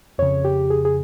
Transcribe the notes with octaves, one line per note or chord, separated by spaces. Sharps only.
F2 C#3 C#5
G4
G#4
G#4